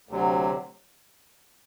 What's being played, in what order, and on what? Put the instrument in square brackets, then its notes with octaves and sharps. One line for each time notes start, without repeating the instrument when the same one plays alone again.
[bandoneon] D2 C3 F#3